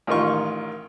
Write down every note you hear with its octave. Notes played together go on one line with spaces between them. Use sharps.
A1 D#3 F4 C#6